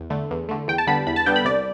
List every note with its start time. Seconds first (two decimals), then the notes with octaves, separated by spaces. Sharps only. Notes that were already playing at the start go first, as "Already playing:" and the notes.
Already playing: E2
0.10 D3 A3
0.31 E2
0.49 D3 A3
0.68 E2 G5
0.78 A5
0.87 D3 G3 B3 B5
1.07 E2 B5
1.16 A5
1.26 D3 G3 B3 G5
1.36 B5
1.45 C2 D5